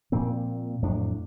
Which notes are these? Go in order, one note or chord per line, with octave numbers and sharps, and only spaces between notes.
A#2 F3 A#3 C4
F2 A2 F#3 D4